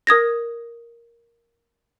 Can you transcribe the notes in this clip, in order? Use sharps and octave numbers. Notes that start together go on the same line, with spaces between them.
A#4 D#6 G#6 A#6